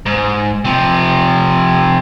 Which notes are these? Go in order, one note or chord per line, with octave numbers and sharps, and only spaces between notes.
G#2
C3 F3